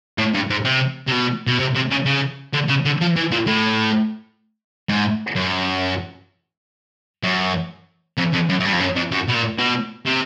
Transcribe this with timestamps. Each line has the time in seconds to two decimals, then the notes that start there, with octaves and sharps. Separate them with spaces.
0.18 A2
0.34 G2
0.50 G#2
0.65 C3
1.07 C3
1.12 B2
1.47 B2
1.60 C3
1.75 C3
1.91 C#3
2.06 C#3
2.53 D3
2.68 C#3
2.85 D3
3.01 F3
3.16 E3
3.31 A#2
3.47 A2
4.89 G#2
5.36 F#2
7.23 F#2
8.18 F2
8.33 F2
8.49 F#2
8.60 F#2
8.65 G2
8.73 F2
8.80 F#2
8.96 F2
9.12 F#2
9.28 B2
9.34 A#2
9.58 B2
10.06 C3